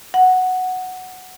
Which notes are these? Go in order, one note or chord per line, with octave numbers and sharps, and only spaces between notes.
F#5